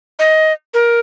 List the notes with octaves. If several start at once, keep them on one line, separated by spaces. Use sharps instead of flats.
D#5
A#4